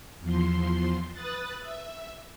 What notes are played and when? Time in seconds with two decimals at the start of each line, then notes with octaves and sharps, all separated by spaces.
0.21 E2 F3 C6
1.12 B4 D#6 F#6 A6
1.60 E5